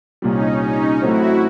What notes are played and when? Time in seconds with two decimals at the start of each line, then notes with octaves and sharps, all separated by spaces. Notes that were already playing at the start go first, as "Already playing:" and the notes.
0.22 C2 A#2 G3 C#4 D#4
0.62 C#4 D#4
1.02 A1 A2 F#3 A3 C4 E4 F#4